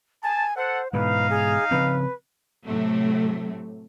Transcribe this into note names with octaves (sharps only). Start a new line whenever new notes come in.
G#5 A5
A4 C5 F#5
G#2 B2 E3 D#4 B4 F5
G#4
C#3 F3 C4 B4
A2 C3 F#3 A3